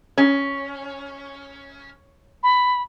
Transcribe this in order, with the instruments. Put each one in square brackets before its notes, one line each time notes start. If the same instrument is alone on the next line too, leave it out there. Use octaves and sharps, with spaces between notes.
[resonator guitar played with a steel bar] C#4
[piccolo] B5